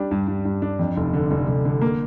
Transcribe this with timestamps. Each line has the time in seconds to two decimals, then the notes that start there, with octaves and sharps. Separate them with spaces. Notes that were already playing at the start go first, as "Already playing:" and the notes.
Already playing: G3 D4
0.11 G2
0.28 G2
0.45 G2
0.62 D4
0.79 F2
0.97 F1
1.13 D3
1.31 F1
1.48 F1
1.65 D3
1.82 A#3